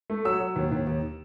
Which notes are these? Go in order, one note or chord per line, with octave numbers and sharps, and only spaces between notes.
A3
F#3 E6
F#3
D#2
D#2
D#2